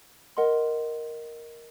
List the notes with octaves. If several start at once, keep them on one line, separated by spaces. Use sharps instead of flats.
A#4 D#5 F#5 C6